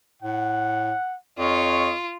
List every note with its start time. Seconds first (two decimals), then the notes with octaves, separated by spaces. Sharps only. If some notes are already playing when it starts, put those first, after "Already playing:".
0.23 A2 F#5
1.39 F2 F4 C#5 D#5 C#6